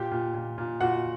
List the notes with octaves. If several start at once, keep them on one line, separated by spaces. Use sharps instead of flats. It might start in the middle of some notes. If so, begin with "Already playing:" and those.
Already playing: A#2 G4 G5
A#2
A#2
A#2
A#2 F#4 F#5